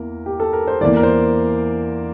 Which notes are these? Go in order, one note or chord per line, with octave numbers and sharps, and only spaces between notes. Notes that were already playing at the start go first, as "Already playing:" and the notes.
Already playing: E2 E3 A#3 A#4
G4
A4
A#4
C5
E2 E3 A#3 D5
A#4
C5